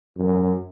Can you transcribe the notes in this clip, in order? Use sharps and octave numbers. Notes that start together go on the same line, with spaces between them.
F#2